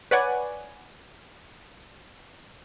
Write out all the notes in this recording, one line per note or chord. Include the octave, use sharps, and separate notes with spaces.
B4 C#5 D5 F#5 G#5